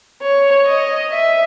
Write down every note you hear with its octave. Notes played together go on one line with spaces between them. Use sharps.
C#5
D#5
E5